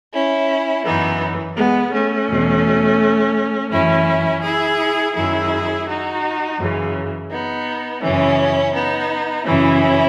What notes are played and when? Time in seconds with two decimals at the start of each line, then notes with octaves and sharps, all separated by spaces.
0.13 C#4 E4
0.85 F#2 E3 B3 D#4
1.56 G#3 B3
1.92 A3 C#4
2.29 E2 B2
3.71 F#2 E3 C#4 E4
4.43 E4 G#4
5.15 F#2 D#3 E4 G#4
5.88 D#4 F#4
6.58 F#2 C#3 E3
7.30 B3 D#4
8.01 F#2 C#3 E3 C#4 E4
8.73 B3 D#4
9.45 F#2 C#3 E3 C#4 E4